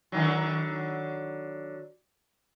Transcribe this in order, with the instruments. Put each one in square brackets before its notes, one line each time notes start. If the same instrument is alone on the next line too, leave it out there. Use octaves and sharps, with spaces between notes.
[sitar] D3 D#3 F#3